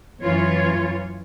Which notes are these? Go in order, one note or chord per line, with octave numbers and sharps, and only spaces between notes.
F#2 E3 F4 C#5